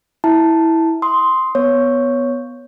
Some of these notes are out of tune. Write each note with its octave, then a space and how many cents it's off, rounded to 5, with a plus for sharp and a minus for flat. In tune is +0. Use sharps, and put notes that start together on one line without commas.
E4 -15 A5 +0
C6 +0 D#6 +20
B3 +0 C#5 +0